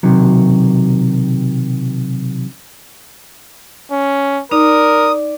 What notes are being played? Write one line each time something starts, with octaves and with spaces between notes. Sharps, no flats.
B1 C3 D#3 F#3
C#4
D#4 A#4 D5 D#6